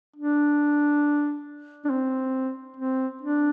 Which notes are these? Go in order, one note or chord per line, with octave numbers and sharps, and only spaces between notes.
D4
D4
C4
C4
D4